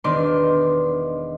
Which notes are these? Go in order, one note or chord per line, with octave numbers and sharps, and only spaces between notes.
E1 D#3 B3 D4 D5 C6